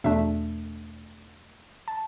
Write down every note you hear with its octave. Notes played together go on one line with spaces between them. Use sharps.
E2 B2 A3 D4 E5
A5